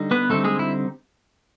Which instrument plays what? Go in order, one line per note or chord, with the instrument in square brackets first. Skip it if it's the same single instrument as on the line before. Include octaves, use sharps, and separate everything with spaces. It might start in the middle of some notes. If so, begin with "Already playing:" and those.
Already playing: [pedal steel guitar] D3 G3 D#4
B3 B4
D3 G3 A3 C4 D#4 A4
G#3 G#4
E4